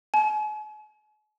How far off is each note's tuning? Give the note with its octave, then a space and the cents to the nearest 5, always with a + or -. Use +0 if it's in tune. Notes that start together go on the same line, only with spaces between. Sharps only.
G#5 +45